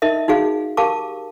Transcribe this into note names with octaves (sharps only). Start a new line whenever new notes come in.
D#4 A#4 D#5 E5
D#4 F#4 G#4 F5
G4 A#4 F5 A5 D6